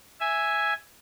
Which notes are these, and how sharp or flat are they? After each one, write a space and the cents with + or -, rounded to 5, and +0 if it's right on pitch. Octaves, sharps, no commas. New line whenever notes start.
E5 +0 G#5 +0